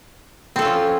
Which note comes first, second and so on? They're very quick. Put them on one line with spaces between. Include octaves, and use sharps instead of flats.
C4 A4 F4 C#4 F3